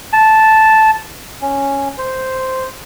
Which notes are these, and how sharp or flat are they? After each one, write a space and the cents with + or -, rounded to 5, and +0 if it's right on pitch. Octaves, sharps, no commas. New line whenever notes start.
A5 -5
C#4 -5
C5 -5